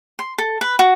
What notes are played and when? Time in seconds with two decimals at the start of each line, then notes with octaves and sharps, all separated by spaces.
0.19 C6
0.38 A4
0.61 B4
0.79 F#4